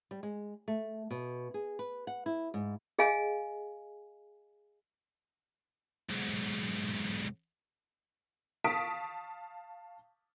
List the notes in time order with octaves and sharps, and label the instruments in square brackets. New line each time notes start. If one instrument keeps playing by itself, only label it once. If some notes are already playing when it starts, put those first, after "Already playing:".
[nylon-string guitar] G3
G#3
A3
B2
G#4
B4
F#5
E4
G#2
[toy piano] G#4 D#5 F5 G#5
[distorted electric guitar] B1 G#2
[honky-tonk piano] F5 A5 C#6 D#6 B6 D7